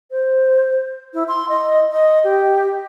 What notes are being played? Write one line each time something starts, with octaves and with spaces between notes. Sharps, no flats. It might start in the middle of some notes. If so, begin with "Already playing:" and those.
C5
E4
C6
D#5
D#5
G4